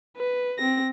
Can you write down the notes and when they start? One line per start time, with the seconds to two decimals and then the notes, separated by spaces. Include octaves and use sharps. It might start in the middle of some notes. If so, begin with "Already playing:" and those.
0.17 B4
0.59 C4 A#6